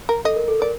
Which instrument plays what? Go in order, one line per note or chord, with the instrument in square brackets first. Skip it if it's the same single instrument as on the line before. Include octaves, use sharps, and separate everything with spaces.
[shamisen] A#4
[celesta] A4 [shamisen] D#5
[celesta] A#4
A4
[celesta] A#4 [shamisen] D5